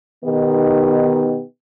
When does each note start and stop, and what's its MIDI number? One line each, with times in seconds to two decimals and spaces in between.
0.25 1.43 47
0.25 1.43 51
0.25 1.43 59
0.25 1.43 63
0.25 1.43 67